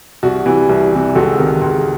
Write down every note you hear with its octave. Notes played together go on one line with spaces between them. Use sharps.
C2 F#4
C3 E3
C2
C3 E3
C#2 F#4 A4
C3 D#3
C#2